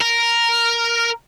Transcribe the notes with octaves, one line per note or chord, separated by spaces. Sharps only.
A#4